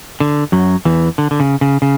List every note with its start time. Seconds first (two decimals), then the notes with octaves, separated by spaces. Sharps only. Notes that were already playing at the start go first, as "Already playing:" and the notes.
0.20 D3
0.52 F#2 F#3
0.85 E2 E3
1.18 D3
1.31 D3
1.40 C#3
1.61 C#3
1.82 C#3